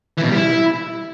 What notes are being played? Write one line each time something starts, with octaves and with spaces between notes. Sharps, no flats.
E3
B2
G3
E4